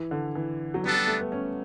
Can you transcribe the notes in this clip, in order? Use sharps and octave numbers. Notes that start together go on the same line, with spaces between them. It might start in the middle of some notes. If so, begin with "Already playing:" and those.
Already playing: E3
D3
E3
F#3
G3 B3 D4 A4
G3
A3
B3
C#4